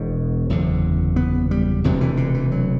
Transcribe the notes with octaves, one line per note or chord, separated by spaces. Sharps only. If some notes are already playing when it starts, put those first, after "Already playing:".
Already playing: E1 E2 B2 B3
F#1 E2 D3
B3
G3
E1 D2 C3 F#3
E3
D3
E3
F#3